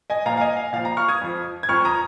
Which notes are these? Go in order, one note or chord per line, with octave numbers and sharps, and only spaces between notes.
D#5 G#5
A#2 F3 F5 A#5
F5
D#5 G#5
F5
A#2 F3 F5
F5 A#5
C#6 F6
D#6 G#6
F2 F3
G#6
F2 F3 C#6 F6
A#5 D#6